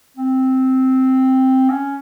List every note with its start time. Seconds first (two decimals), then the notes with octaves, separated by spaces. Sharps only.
0.17 C4
1.70 C#4